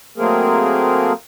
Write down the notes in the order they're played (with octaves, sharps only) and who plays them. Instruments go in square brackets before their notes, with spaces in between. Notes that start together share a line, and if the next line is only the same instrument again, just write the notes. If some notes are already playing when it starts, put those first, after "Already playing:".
[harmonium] F#3 A3 A#3 C4 G#4 A#4